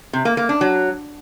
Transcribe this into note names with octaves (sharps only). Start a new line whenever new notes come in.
C3
A#3
A#3
D4
F#3